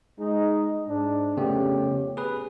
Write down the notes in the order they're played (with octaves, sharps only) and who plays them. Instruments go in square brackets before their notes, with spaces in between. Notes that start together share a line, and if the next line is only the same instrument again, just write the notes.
[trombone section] G#3 D#4
G#2 D4
[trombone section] F2 C#4 G4 [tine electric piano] C#3 A3 B3
[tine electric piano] G#4 B4